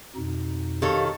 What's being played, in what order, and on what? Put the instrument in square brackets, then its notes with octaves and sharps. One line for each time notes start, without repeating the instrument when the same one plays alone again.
[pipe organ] F2 B2 D#4
[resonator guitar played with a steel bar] D#3 A4 C#5 [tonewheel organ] G4 F5